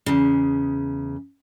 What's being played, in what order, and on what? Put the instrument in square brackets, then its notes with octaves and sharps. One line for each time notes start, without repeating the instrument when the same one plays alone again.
[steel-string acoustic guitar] E2 C#3